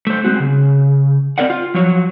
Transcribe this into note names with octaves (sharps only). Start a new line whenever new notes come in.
A3 C5
G#3 C4 F#4
C#3
C4 E4 A#4 D5 D#5 F#5
F4
F3 F#3 C#5